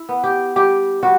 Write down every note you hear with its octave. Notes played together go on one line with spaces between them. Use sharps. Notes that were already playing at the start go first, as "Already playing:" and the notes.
Already playing: E4
B3
G4
G3 G4
G3 F#4